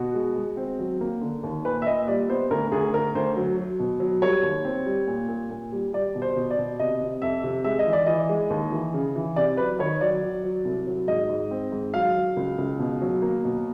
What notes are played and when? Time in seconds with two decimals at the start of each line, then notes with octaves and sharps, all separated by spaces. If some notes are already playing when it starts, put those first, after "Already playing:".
Already playing: B2 F#4
0.14 G#3
0.36 G#3
0.57 C4
0.79 F#3
1.01 A#3
1.21 D3
1.43 D#2
1.65 A#2 B4
1.82 E5
1.86 A#2 D#5
2.08 G3 D5
2.29 B3 C5
2.51 D2 A#4
2.72 D2 G#4
2.94 D2 A#4
3.15 D2 C5
3.36 F#3
3.57 F#3
3.79 B2
4.00 F#3
4.22 G3 C#5
4.43 D#2
4.65 C4
4.86 G3
5.07 A#2
5.29 A#2
5.51 A#2
5.72 G3
5.93 G3 D5
6.15 B2
6.22 C5
6.36 B2
6.51 D5
6.58 B2
6.79 C3 D#5
7.00 C3
7.22 F2 E5
7.43 C3
7.64 G#3 E5
7.79 D#5
7.86 E3
7.93 D5
8.06 E3 D#5
8.29 G#3
8.50 D#2
8.72 E3
8.94 C#3
9.16 E3
9.36 C3 D5
9.57 F#3 B4
9.79 D#3 C#5
10.01 F#3 D5
10.23 F#3
10.44 F#3
10.65 C2
10.87 F#3
11.07 G#2 D#5
11.29 G#2
11.51 C4
11.72 G#2
11.94 F#3 F5
12.15 F#3
12.37 C#2
12.58 C#2
12.79 B2
13.01 F#3
13.22 A#3
13.44 B2